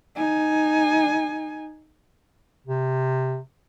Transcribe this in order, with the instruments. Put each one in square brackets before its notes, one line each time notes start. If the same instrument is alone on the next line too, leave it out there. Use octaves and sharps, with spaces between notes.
[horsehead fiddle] D#4 G#5
[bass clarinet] C3